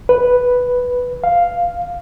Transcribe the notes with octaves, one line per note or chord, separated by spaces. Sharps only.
B4
F5